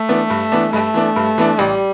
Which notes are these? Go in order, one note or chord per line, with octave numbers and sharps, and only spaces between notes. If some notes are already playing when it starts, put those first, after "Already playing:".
Already playing: A3
E3 B3 D4
G2
E3 B3 D4
G2 A3
E3 B3 D4
G2
E3 B3 D4
A1 G3